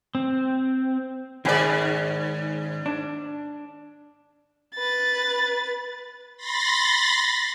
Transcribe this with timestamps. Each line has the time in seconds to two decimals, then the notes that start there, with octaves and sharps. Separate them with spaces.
0.15 C4
1.45 G#2 D#3 C#4 G#4 D5
2.86 D4
4.75 B4 A6
6.37 B5 C6 A6 A#6